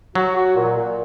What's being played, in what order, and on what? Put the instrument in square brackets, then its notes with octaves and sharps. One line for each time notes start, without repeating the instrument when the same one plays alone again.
[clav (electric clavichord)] F#3 [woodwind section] F#4
[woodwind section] F#4
A#2
A#2